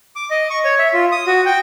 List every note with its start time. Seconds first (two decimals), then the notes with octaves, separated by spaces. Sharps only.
0.16 D6
0.30 D#5
0.50 C#6
0.64 C#5
0.79 E5
0.94 F4
1.12 D#6
1.27 F#4
1.46 G5